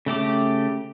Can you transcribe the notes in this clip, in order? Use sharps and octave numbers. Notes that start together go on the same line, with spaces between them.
C#3 A3 G4 D6